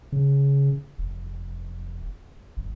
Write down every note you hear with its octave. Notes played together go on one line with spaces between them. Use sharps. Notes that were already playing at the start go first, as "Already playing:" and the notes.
C#3
F1
G1